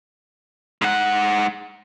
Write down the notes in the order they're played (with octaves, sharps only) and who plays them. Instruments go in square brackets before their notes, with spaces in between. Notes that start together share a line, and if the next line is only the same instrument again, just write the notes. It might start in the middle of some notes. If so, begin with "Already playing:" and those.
[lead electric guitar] G#2 F#5